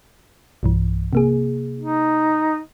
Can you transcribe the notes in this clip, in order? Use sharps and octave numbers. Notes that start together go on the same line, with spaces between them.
B1 G2 E3
C3 A#3 G#4
D#4